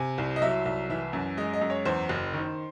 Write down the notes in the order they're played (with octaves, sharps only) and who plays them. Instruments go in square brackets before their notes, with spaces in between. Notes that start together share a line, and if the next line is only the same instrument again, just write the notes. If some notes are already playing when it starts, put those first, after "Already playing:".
Already playing: [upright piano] C3 G#5
C2
D#5
F#3 E5
C2
E3 E5
F#2
G#3 D#5
D#5
F#2
C#5
E2 C5
F#1
D#3